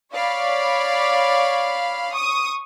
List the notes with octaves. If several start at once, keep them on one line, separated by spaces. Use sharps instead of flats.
C#5 D5 F5 B5
C#6 D#6